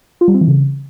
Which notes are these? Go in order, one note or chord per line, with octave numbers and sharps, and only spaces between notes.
F4
G3
C4
E3
C#3